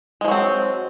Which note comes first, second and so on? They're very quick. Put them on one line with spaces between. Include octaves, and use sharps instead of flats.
G#3 F3 F#3 C4